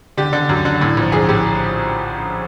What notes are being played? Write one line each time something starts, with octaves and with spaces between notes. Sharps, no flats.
D3 G4
D3
F#2
D3
A2
A#1
A#1 G#4
A2 G4